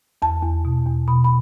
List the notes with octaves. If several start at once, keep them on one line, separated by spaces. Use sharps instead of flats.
E2 A5
E2
B2
E2
B2 B5
B5